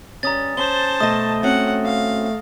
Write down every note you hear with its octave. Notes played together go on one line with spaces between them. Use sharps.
G2 C#4 A#5 D#6 A6
C#4 C5 A5 G7
B2 A3 D#5 D#6 A#6
C4 C#4 F#4 F#5
F5